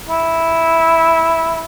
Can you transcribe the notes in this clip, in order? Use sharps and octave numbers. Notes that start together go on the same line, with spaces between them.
E4